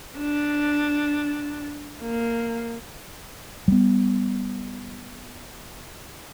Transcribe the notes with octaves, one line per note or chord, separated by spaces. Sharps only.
D4
A#3
G3 B3